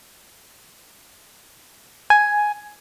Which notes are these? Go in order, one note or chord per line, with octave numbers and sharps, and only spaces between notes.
G#5